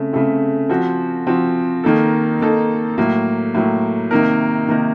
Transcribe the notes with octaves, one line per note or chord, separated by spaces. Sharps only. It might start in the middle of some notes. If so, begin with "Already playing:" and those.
Already playing: C#3 A3 C4
C#3 A3 C4
F3 C4 F#4
F3 C4 F#4
D#3 A#3 D#4 A4
D#3 A#3 D#4 A4
A2 F#3 A#3
A2 F#3 A#3
C3 D#3 A#3 D#4 A#4
C3 D#3 A#3 D#4 A#4